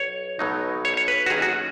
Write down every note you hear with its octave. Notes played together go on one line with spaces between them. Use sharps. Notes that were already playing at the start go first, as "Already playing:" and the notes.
Already playing: B1 C#5
B1 B2 F#3 D#4
C#5
C#5
B4
F#4
D#2 D#3 F#3 C#4 G#4
F#4